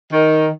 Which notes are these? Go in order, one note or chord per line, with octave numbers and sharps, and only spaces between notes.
D#3